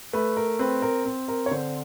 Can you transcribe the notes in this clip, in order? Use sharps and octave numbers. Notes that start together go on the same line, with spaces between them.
A3 B4
A#4
C4 B4
A#4
C4
A#4
C#5
D3 C5